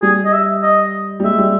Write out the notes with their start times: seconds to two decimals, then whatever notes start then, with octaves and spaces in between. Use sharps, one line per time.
0.02 G3 G#4
0.25 D#5
0.33 E5
0.63 D#5
1.20 G3
1.24 G#3 E5
1.39 G3